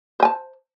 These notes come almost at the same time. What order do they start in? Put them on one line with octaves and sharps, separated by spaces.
C5 G#5 A5